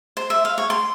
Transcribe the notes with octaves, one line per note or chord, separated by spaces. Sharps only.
C5
E5
F5
C#5
C6